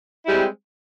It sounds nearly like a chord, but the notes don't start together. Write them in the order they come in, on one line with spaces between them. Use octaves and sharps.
E4 G3 G#3 C4